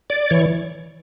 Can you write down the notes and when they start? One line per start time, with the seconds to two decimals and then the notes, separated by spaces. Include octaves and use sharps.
0.10 D5
0.30 E3 C#5